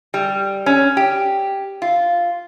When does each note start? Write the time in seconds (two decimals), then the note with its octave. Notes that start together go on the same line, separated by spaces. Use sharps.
0.14 G3
0.66 C#4
0.97 G4
1.82 F4